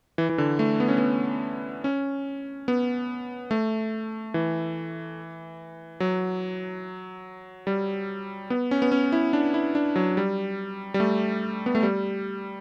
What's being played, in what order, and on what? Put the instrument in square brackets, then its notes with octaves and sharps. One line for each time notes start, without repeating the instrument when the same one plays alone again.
[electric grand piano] E3
E3
D3
A3
B3
C#4
B3
C#4
B3
A3
E3
F#3
G3
B3
C#4
B3
C#4
E4
D4
E4
D4
F#3
G3
G3
A3
B3
A3
G3